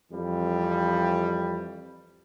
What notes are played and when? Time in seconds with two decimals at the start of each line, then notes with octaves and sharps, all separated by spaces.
0.11 F2 E3 G3